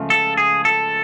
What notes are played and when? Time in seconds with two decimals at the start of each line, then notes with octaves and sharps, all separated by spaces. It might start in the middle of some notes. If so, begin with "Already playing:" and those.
Already playing: C#2 C#3 F3 A3
0.10 A4
0.37 G#4
0.65 A4